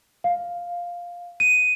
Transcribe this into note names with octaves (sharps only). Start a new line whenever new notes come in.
F5
D#7